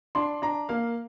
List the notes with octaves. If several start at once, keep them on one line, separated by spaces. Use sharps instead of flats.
D4 C6
D4 A#5
A#3 F5